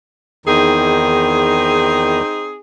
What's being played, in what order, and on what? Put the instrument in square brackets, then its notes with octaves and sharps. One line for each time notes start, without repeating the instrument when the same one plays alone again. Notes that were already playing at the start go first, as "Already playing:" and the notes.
[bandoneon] E2 D#3 [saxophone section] C4 D#4 G#4